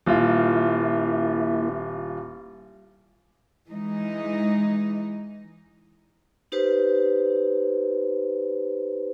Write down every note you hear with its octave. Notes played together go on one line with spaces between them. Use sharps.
D#1 A#3 E4 F4 E5
E3 G#3 D#4
D#4 G4 B4 C5